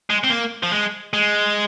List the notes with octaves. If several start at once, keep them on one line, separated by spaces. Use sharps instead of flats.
G#3
C4
A#3
F3
G#3
G#3